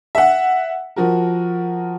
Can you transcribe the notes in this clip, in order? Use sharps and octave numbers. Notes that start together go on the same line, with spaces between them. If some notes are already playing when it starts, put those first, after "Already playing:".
E5 F#5
F3 F#4 A#4